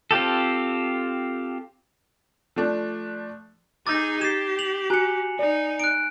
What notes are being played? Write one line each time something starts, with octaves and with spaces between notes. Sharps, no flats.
C4 F4 G4 A4
F3 A3 D4
D#4 G#4 D6 E6 G6 A6 A#6
G4 G#6 A6 C7 E7
F7 F#7
F#4 G#5 A#5 F#6 C#7
D#4 D5
F#6 D7